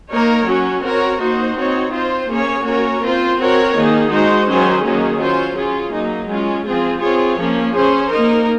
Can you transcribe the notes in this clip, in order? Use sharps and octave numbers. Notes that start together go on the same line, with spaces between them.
A#3 D#4 A#4 C#5
F#3 C#4 F#4
C4 F#4 A#4 C#5
A#3 D#4 F#4 C5
C4 D#4 F#4 C#5
C4 F4 C5
A#3 C#4 G#4 C#5
A#3 C#4 F#4 A#4 C#5
C4 F4 C5
C4 F#4 A#4 C#5
D#3 A#3 D#4 G#4
G#3 D#4 F#4 C5
D#3 F#3 C#4 G#4 C5
D#3 F#3 A#3 C#4 G#4
F#3 C#4 F4 C5
C#4 F4 G#4
F#3 A#3 D#4
G#3 C#4 F4
F3 C4 F4 G#4
C4 F4 G#4 C#5
F3 A#3 C#4
C#4 G#4 C5
A#3 D#4 A#4